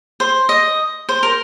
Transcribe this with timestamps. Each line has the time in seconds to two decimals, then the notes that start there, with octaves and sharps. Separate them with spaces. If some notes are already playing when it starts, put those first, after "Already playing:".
0.20 C5
0.49 D#5
1.09 C5
1.23 A#4